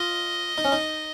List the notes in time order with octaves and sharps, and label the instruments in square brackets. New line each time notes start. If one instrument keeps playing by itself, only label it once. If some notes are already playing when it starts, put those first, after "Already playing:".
Already playing: [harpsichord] F4 [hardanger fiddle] D#5
[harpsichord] D#4
C#4
D#4